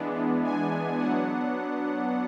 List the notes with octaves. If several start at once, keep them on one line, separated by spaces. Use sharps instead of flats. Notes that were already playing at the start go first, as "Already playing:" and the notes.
Already playing: E3 G#3 B3 D4
G#5
F#3 B3 D4 F#5